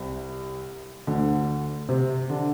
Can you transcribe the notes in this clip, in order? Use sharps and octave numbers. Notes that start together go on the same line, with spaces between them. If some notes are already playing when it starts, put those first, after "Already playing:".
Already playing: C2 C3
D2 D3
C3 C4
D3 D4